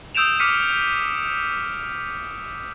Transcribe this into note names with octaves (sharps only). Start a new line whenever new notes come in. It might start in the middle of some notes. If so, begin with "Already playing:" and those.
D#6 E6 G6 D7 E7 F7
D6 F6 B6 C#7 D#7